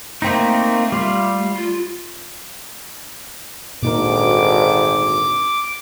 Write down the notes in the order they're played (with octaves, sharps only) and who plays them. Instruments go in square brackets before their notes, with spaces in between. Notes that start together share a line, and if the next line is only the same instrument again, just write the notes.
[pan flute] A3 [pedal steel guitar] A#3 C4 D#4
[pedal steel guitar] G3 F4
[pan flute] F4
[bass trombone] G#1 [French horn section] D2 [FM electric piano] A#2 D#4 A#4 [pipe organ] D6